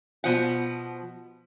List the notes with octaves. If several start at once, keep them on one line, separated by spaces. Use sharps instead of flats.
B2 F3 F#5